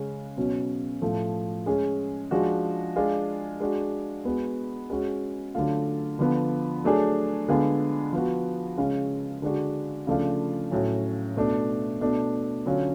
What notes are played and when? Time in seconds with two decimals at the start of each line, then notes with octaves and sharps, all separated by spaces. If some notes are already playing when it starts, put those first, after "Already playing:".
Already playing: C#3 G#3 C#4
0.37 B2 F#3 C#4
1.02 A2 F3 A3
1.66 G#3 C#4 G#4
2.31 F3 G#3 D4 F#4
2.96 G#3 D4 F4 G#4
3.60 G#3 D4 F#4
4.25 G#3 B3 F#4
4.90 G#3 C#4 F#4
5.55 D3 F#3 A3 F4
6.19 D3 F3 B3
6.84 F#3 A3 D4 G#4
7.48 D3 G#3 B3 F4 G#4
8.13 F3 B3 F#4
8.78 C#3 G#3 C#4 F4
9.42 D3 G#3 D4 F#4
10.07 C#3 F3 A3 D4 F4
10.71 A2 F#3 C#4
11.36 B2 A3 D4
12.01 B2 A3 D4
12.66 D3 F#3 C#4 F4